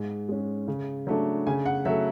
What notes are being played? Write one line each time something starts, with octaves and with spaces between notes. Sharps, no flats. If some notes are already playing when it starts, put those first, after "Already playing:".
Already playing: G#2
G#3 C#4
C#3
F#3 A3 D4
C#3 G#5
F#5
F#3 A3 E5